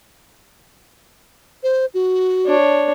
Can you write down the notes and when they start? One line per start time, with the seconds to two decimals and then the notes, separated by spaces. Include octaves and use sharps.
1.63 C5
1.94 F#4
2.46 D4 C#5